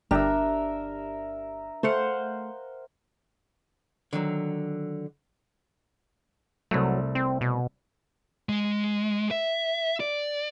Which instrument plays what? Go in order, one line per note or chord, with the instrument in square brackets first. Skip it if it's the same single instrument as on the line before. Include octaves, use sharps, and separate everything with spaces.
[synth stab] G1 G4 [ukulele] D4 [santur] A#4 E5
[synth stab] A3 [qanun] C5 F5 F#5
[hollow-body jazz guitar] D3 D#3 F#3
[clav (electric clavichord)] C2 A3 [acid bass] F#3
[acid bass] C4
B2
[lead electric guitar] G#3
E5
D5